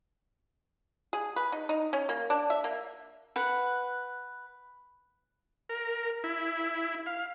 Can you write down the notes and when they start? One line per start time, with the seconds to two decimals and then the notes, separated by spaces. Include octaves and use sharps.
1.13 G#4
1.36 B4
1.52 D#4
1.69 D#4
1.93 C#4
2.09 A#3
2.30 D4
2.50 E5
2.64 A#3
3.36 B4 F#5
5.69 A#4
6.24 E4
7.06 F5